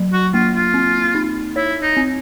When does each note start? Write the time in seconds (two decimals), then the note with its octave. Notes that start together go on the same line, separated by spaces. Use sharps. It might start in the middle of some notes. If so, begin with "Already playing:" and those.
Already playing: F#3
0.13 F#4
0.34 A#3 F4
0.54 F4
0.74 C4
1.15 D#4
1.56 E4 C#5
1.82 D#4
1.97 C4